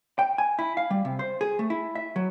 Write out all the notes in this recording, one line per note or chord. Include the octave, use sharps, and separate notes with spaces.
G5
G#5
E4
F5
G3
C3
C5
G#4
A3
E4
E5
F#3